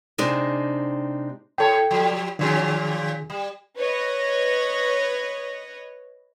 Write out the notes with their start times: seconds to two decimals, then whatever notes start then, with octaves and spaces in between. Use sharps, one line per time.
0.18 C3 G#3 C4 D4 D#4
1.58 A2 A4 C#5 G5
1.91 F3 G3
2.39 A#2 D#3 F3 C#4 G#4
3.30 G3
3.77 B4 C#5 D#5